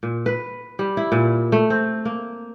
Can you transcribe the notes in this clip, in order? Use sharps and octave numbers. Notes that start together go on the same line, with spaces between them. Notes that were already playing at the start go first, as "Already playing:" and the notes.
A#2
B4
G3
E4
A#2
A3
C4
A#3